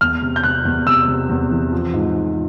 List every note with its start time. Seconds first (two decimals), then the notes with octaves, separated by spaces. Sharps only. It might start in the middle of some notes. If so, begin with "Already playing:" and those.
0.01 E2 F6
0.22 C3
0.36 G6
0.44 C3 F#6
0.65 E2
0.87 C3 E6
1.08 C3
1.29 E2
1.51 E3
1.72 F3
1.94 G#2
2.15 F3